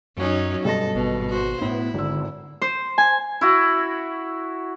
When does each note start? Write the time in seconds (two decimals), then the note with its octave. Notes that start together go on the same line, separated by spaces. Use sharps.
0.18 F#2 F#3 C#4 D#4
0.65 G2 B2 A4 D#5 A#6
0.95 G#1 B2
1.29 F#4 C5
1.61 A2 B3 E4
1.94 G#1 D3 E6
2.61 C5
2.98 G#5
3.41 E4 F#4